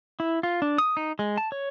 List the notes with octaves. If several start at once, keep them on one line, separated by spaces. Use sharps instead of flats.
E4
F4
D4
D#6
D#4
G#3
A5
C#5